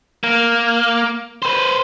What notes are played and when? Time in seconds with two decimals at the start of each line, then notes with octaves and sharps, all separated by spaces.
0.24 A#3
1.42 B4 C5